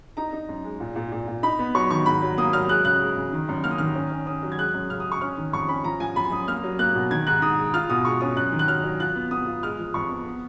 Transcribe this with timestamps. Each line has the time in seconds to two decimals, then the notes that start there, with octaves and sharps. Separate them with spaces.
0.17 D#4 A#5
0.33 D#4
0.49 F#2
0.64 G#3
0.80 A#2
0.96 A#2
1.12 A#2
1.27 A#2
1.43 D#4 B5
1.59 B3
1.75 F#3 C#6
1.90 D#3 C#6
2.06 G#2 B5
2.22 F#3
2.38 A#3 D#6
2.53 F#3 F6
2.69 G#3 F#6
2.85 C#3 F#6
3.01 G#3
3.17 C#3
3.32 D#3
3.49 F#2
3.64 A#3 F6
3.71 D#6
3.78 D#3 F6
3.96 C#4
4.12 C#4
4.27 C#4 D#6
4.43 F#3
4.52 G#6
4.58 G#3 F#6
4.74 F#2
4.90 C#3 F6
5.00 D#6
5.06 G#3
5.12 C#6
5.21 C#4 F6
5.37 D#3
5.53 F2 C#6
5.69 C#4 B5
5.84 F3 A#5
6.00 F3 G#5
6.16 F#2 B5
6.32 F#2 D#6
6.47 A#3 F6
6.64 F#3
6.79 A#3 F#6
6.95 B2
7.11 D#3 G#6
7.27 G#2 F#6
7.42 G#2 D#6
7.58 G#3
7.74 F4 F6
7.90 B2 D#6
8.05 G#3 C#6
8.21 C#4 D#6
8.36 F#2 F#6
8.52 D#3
8.59 F#6
8.68 F#3 F6
8.84 F#3
9.00 F4 F#6
9.15 B3
9.31 B3 D#6
9.47 F4
9.63 G#3 F6
9.79 F3
9.94 F2 C#6
10.11 B3
10.26 B3